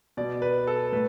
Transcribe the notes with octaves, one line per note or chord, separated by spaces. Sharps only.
B2 D5
B4
A4
A2 B4